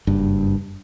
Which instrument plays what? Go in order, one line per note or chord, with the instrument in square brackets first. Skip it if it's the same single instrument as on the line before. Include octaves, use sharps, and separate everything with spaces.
[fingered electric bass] F#1 G2